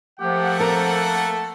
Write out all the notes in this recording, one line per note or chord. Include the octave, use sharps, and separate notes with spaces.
F3 A3 A#3 G4 F#5
C4 A4 A#4 A#5